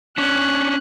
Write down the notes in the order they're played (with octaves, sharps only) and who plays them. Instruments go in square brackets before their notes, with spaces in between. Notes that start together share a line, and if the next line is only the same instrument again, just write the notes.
[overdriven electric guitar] C#4 D4 [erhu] F#6